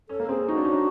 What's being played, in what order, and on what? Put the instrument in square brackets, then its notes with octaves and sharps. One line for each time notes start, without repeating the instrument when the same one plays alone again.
[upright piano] C#4 [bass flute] A4
[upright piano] A#3
[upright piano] C4 [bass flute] G#4
[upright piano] C#4
[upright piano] D#4 [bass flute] F#4
[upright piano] D4
C#4
D4